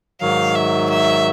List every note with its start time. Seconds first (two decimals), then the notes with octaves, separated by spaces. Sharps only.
0.21 G#2 D#3 F#3 F5
0.56 E5
0.90 E5